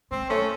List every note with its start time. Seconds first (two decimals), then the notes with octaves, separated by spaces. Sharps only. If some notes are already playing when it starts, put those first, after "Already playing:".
0.11 G#3 C4
0.30 A3 C#4